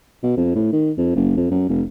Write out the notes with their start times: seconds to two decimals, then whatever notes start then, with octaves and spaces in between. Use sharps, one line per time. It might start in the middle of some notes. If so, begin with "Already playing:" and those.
0.23 B2
0.37 F2
0.55 A2
0.72 D#3
0.98 F2
1.16 F#1
1.37 F2
1.51 F#2
1.69 F1